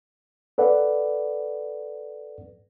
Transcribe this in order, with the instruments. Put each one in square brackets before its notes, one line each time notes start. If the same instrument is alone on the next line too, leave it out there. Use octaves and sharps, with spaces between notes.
[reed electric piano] A4 B4 D5 F#5